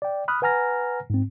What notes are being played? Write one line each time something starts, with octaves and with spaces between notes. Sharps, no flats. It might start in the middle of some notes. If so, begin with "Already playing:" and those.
D5 G5
B5 D#6 F6 F#6
B4 F#5 G#5 A#5 F6 A#6
G#2 C4